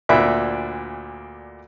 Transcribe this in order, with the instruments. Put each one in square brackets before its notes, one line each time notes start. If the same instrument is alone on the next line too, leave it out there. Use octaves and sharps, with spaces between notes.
[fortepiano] D2 A#2 D4 E5 B5